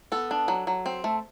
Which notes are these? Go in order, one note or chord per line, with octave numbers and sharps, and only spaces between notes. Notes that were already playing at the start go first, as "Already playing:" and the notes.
B3 A4
D4
F#3
F#3
C4
A3